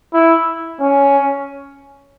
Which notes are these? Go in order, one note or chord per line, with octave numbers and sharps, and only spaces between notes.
E4
C#4